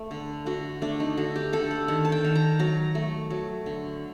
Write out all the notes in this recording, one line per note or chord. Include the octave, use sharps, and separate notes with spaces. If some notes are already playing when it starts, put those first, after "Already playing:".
Already playing: A3
D3
D3 F#4
A3 D4
D#4
D3 F#4
G4
D3 A4
F#5
D#3 F#5
A5
G5
D#3
A#5
F#3 A#5
A3
F#3
D3